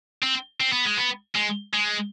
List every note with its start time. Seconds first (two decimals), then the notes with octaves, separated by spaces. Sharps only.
0.22 C4
0.60 C4
0.72 B3
0.85 G#3
0.97 B3
1.35 G#3
1.74 G#3